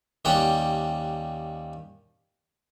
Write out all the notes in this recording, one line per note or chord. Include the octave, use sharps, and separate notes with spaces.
D#2 G3 C#4 F#5 G5